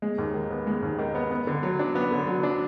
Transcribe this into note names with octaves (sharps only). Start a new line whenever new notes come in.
G#3
D#2
D#3
B3
G#3
D#2
D#3
B3
B3
D3
F#3
D4
B3
D3
F#3
D4